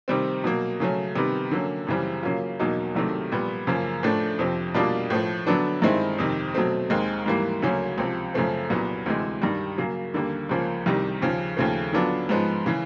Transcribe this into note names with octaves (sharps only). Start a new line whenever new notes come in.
C3 D#3 G3 C4
B2 F#3 A#3
C#3 F#3 A3 C#4
C3 D#3 G3 B3
D3 F#3 A#3 C#4
F#2 C#3 E3 G3 C4
C#3 F#3 A#3 C#4 F4
E2 B2 F#3 A#3 D#4
C2 C3 D#3 F#3 A3
A#2 G3 B3
F#2 C#3 F3 A#3
A2 F3 A3 D4
F2 C3 F3
B2 G3 A#3 D4 F4
A2 F3 A3
D3 F#3 B3 D4
G2 D#3 G#3 C4 E4
F2 C3 D#3
B2 F#3 A3 C4
D#2 D#3 G#3 C4
G#2 E3 G3 A#3
D2 C#3 F#3 A#3 C#4
C#2 C3 F3
F#2 C#3 F3 A3 C4
C2 A#2 F#3 B3
D2 C3 E3 G#3
G2 D#3 G3
C#3 F#3 A#3
D#2 D3 G3 A#3
C#2 C#3 F3 A#3
C2 C3 D#3 G3
D#2 C#3 F3
D#2 C#3 F3 A3
D3 F#3 B3 D4 F4
G#2 F3 G#3 B3
C#3 E3